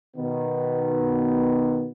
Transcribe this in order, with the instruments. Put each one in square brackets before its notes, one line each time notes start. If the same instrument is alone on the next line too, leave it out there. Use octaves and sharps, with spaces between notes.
[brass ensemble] B2 D#3 B3